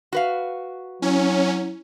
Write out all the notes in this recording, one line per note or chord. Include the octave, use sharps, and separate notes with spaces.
F#4 B4 F5
F#3 C#4 E4